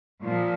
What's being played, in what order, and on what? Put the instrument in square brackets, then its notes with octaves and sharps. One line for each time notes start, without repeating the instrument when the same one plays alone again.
[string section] A#2 F3